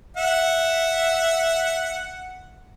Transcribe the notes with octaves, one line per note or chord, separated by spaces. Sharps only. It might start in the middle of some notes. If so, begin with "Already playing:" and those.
E5 F#5